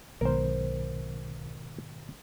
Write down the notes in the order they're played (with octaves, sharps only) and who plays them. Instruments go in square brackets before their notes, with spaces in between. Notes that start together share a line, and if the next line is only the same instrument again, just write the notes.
[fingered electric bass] B1 [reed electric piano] G#2 B2 D#3 [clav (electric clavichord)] A#4 C5